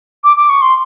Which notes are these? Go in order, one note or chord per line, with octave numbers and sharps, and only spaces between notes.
D6
D6
C#6
C6